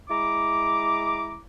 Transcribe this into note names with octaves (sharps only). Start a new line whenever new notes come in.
G#3 E4 A#5 D6